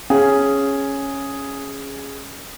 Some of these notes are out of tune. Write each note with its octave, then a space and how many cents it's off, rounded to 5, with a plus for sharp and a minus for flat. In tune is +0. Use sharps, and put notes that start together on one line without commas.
C#4 -5 G#4 +0 F5 -5